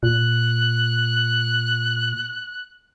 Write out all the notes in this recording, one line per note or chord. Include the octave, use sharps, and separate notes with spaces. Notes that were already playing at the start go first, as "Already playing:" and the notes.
A#2 F#6